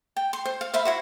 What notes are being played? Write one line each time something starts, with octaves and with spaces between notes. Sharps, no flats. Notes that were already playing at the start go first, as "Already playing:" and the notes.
G5
C6
C5
F5
C5 E5 F5 B5
E4 F#4 C5